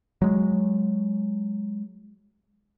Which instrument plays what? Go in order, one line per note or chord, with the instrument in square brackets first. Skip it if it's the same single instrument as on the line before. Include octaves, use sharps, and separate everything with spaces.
[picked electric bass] F#3 G#3